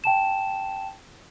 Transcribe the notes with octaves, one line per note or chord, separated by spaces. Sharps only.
G5 A5 E7